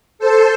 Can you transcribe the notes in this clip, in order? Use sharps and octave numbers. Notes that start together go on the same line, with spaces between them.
A4 C5